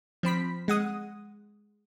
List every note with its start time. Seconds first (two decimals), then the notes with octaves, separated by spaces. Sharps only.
0.23 F3 C4 B5 B6
0.68 G#3 F#5 D#6